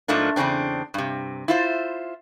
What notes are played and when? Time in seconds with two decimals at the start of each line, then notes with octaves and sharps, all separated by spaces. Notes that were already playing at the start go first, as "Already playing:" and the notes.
0.08 G#2 F3 A3 A#3 D4
0.36 E2 G2 C#3 C4 D4
0.94 G2 C3
1.48 E4 F4 C5